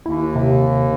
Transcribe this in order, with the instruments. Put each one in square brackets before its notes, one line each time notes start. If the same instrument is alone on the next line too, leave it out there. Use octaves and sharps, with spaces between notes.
[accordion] D#2 [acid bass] E4
[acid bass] C3